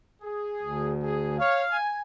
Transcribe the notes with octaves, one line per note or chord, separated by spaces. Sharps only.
G#4
D2
G#4
C#5 F5
G#5